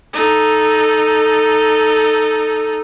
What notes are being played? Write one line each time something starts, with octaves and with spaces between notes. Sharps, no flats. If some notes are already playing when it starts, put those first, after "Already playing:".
D#4 A4